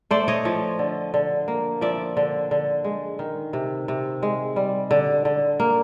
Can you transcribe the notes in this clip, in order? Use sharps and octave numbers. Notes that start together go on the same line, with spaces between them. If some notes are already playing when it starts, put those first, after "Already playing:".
A3 C5 D5
C#5 D#5
F3
D3
D3
A#3
F3 D5 E5
D3
D3
G#3
D#3
C3
C3
G#3
G3
D3
D3
A#3